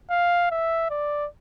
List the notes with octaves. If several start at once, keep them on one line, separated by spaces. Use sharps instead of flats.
F5
E5
D5